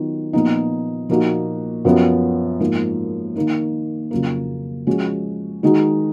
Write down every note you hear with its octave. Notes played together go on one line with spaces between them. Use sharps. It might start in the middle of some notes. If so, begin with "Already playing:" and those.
Already playing: D#3 F#3 B3 F4
A#2 F3 B3 D#4
A#2 F3 A#3 D#4 F#4
F#2 F3 B3
G#2 F3 A#3
D#3 A#3 D#4
F2 C#3 F#3 A#3
F3 G#3 C#4 F#4
D#3 G#3 D#4 F#4